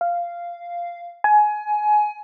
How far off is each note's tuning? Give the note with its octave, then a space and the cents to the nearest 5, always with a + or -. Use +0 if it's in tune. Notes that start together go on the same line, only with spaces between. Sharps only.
F5 -10
G#5 +20